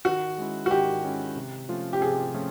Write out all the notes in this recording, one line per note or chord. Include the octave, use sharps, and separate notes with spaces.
D#3 F#4
G#3 C#4 E4
F#4
D#3 G4
G#3 C#4 E4
C3
F3 A3 C#4 F4
G4
C3 G#4
F3 A3 C#4 F4